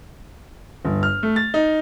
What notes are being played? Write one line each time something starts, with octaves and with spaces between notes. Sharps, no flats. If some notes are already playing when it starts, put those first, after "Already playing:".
G1
F6
A3
A6
D#4